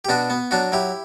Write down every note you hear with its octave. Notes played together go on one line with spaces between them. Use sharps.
G4
B2 D4 F#4
B3
F#3 D4 F#4
F#3 E4 G4